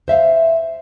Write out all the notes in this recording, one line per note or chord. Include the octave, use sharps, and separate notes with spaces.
C5 E5 F5